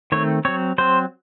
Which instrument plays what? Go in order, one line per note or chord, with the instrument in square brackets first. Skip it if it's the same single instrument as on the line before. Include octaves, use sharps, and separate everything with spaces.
[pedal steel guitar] D#3 A3 C4 C#5
F#3 C4 C#5
F#3 C4 C5